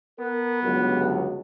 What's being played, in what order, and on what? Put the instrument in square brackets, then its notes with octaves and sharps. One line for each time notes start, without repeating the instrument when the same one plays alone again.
[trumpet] B3 [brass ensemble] A#4
[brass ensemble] G1 C#2 F#3